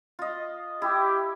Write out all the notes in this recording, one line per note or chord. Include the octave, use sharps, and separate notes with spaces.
F4 D#5
E4 G4